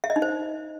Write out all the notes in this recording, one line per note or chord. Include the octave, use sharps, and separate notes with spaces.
E5
D#5
D#4
C5